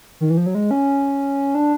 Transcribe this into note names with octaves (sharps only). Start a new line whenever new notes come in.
D#3
E3
F3
F#3
G#3
C#4
D4